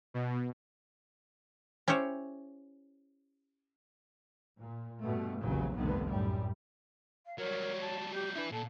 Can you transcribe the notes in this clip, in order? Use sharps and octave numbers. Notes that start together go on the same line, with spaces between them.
B2
C#4 E4 G4 C5 C#5
A#2
G2 B2 A3
F1 A#1 E2 A#2 C#3 F#3
F1 C2 G2 D3 D#3 B3
F#2 A2 G3
F5
F#3 G3 A#4 C#5
A5
G4 G6
D4 E4 B4
A#2 A4 A5